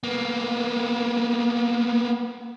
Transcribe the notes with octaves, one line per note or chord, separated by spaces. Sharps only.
A#3 B3